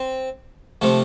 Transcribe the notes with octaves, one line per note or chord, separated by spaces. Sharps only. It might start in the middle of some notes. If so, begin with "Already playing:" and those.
Already playing: C4
C3 F3 A3